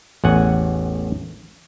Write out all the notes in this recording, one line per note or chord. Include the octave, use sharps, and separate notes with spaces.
A1 E2 F#5 G#5